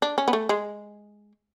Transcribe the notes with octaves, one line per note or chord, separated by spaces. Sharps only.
D4
C#4
B3
A3
G#3